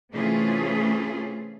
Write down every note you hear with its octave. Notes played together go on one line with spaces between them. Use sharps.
C3 E3 A3 C#4 F4 G#4